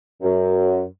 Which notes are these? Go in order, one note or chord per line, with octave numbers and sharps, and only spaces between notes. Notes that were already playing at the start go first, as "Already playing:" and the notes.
F#2